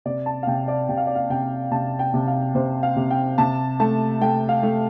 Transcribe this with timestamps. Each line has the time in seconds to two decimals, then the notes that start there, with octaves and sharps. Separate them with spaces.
0.05 C3 D5
0.26 A5
0.43 F5
0.47 C3 G5
0.68 D5
0.89 C3 G5
0.97 F5
1.07 D5
1.15 F5
1.30 C3 G5
1.71 C3 A5
1.99 G5
2.14 C3
2.27 F5
2.55 C3 C5
2.83 F5
2.96 C3
3.11 G5
3.38 C3 A5
3.80 A3 A5
4.21 A3 G5
4.49 F5
4.63 A3